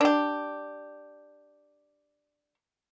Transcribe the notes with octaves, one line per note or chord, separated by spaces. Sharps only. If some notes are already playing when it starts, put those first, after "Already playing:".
D4 G4